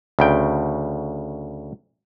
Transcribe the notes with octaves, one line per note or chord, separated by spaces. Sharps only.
D2 C#3 G5